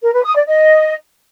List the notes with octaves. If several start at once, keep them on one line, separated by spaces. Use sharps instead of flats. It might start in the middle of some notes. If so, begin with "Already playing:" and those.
A#4
B4
D#6
D5
D#5